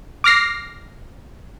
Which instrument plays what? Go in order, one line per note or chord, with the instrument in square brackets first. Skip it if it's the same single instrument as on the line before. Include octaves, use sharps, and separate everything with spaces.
[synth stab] D6 F6 A#6 C7